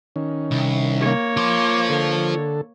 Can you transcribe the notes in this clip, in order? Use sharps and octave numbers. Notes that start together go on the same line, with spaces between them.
D#3 C#4
C2
A#3 C#5
F4 C5 D6
D3 A4